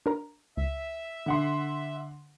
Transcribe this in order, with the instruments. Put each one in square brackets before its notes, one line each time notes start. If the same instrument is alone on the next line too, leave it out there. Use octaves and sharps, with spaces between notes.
[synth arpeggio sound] D4 A#4 A#5
[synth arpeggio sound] C#2 [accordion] E5
[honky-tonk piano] D3 F#5 C6